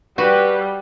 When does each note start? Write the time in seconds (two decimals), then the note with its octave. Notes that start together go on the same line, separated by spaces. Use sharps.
0.18 G3 F#4 G4 B4